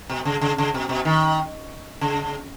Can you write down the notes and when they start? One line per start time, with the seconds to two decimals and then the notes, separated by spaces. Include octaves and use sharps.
0.09 B2
0.25 C#3
0.41 C#3
0.58 C#3
0.74 B2
0.89 B2
1.05 D#3
2.01 C#3